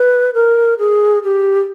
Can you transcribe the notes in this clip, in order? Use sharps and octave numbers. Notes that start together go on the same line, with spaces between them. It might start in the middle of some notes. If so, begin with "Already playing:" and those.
Already playing: B4
A#4
G#4
G4